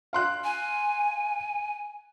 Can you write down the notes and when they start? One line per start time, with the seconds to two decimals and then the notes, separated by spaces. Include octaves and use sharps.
0.13 F5 C6 F#6
0.44 G#5